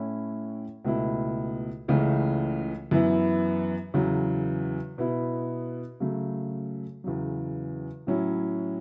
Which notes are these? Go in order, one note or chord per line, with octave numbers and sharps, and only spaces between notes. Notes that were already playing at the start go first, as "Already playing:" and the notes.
Already playing: A2 A3 C#4 E4
C#2 B2 A3 E4
C#2 C#3 E3 A3 C#4
F#2 E3 B3 E4
E2 C#3 F#3
B2 B3 E4
C#3 F#3 A3
E2 C#3 F#3
A2 F#3 C#4 E4